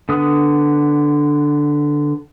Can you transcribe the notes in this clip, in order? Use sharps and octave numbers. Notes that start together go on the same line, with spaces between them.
D3 B3 D#6 F#6